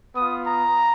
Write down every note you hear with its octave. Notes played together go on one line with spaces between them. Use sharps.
B3 F4 D#6
A#5